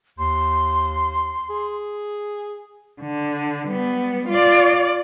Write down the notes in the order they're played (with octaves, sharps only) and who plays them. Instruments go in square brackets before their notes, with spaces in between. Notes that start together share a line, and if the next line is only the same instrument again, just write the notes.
[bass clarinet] D#2 [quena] C6
[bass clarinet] G#4
[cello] D3
G3 B3
F4 D5